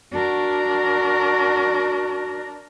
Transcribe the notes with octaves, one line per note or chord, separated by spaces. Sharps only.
D4 F#4 A#4